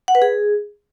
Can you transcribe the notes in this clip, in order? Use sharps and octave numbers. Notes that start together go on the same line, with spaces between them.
F#5
B4
G#4